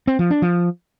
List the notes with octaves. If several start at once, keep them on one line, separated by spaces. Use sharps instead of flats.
C4
F3
D4
F3